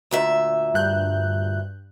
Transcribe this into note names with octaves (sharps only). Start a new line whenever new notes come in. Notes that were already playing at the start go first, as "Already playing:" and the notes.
D2 A#2 E5
G2 F#6 G6